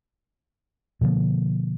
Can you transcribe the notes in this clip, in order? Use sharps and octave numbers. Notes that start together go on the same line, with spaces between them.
B2 D3 F3 A#3